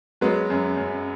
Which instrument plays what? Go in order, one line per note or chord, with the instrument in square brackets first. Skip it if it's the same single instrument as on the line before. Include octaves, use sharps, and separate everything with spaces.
[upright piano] F#3 G#3 B3
F#2
F#2